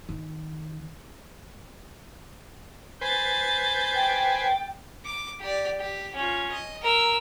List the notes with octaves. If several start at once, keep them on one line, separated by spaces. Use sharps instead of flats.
D#3
B4 C5 G#5 G6 A6
G5
D6
G4 D5
G4
C#4 F4
D#5
A#4 E6